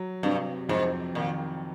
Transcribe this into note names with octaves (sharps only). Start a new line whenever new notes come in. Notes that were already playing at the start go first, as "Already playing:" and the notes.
Already playing: F#3
G2 C3
F2 G#2
A#2 D#3